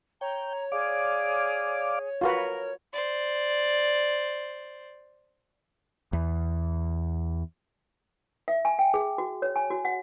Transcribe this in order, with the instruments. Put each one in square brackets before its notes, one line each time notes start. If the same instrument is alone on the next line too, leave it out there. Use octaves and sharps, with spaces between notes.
[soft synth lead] C#5 [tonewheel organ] G5 [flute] A#5
[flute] G#4 [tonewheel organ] D5 F5 D6
[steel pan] F4 F#4 B4 [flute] A#4
[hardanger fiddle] C5 D5
[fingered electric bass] E2
[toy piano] E5
G#5
G5
G#4
F#4
C#5
G#5
F#4
F#5